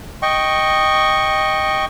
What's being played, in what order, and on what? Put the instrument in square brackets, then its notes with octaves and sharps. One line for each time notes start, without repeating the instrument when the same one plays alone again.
[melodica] D#5 G5 C#6